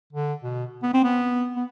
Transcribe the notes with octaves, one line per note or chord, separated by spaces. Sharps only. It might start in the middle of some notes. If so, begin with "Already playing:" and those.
D3
B2
B3
C4
B3
B3